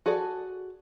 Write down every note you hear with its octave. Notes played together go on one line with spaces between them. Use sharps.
F#4 G#4 A4 D5